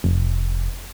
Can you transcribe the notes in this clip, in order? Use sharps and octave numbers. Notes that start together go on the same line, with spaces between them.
F1